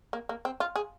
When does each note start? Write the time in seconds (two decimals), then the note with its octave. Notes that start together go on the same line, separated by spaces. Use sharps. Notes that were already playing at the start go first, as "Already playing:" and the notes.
0.13 A#3
0.29 A#3
0.45 C4
0.60 F4
0.76 G#4